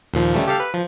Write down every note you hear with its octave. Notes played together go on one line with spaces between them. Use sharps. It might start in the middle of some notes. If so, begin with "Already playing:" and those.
D#2 A#2 F3
C#3 G3 A3
G4 A4 F5
B4
F3